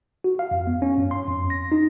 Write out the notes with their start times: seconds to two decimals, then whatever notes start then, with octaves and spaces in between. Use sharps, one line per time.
0.24 F#4
0.39 F5
0.51 F2
0.67 B3
0.82 C#4
0.98 F#2
1.11 C6
1.28 F2
1.50 A#6
1.72 D#4